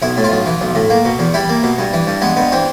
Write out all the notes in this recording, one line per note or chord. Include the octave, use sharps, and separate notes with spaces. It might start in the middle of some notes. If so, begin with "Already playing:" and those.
B1 E4
A2
F4
B1
E3
B1
A2
A#3
B2
E2
G3 E4
A#3
B2
G2
E3
G2
G#3 B3
G2 B3
E3 C4